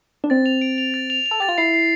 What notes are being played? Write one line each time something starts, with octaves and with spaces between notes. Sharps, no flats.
D4
C4 A6
F7
D7
F7
A6
F7
F7
A4
G4 A6
F4
E4 C7
C7